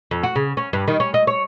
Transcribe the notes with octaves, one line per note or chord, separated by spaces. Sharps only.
F2
F#4
C#3
C#4
G2
D#3
C#4
D#5
C#5